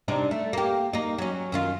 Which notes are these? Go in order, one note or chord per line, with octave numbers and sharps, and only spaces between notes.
C3 D4 D#4
A3
A#3 G4
A#3 D#4
F#3 C#4
F#2 D#3 F4